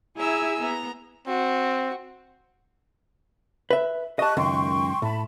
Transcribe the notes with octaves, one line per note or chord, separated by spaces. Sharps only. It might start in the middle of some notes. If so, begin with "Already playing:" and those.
E4 G#4 E5 G#5 A#5 E6
B3 A#5
C4 F#4
B4 E5
G4 D#5 A5 C#6 F#6
C#2 F#2 D#3 G5 C6 C#6
A2 A5 B5